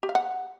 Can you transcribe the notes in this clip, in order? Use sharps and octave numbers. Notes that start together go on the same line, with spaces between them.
G4
F5
F#5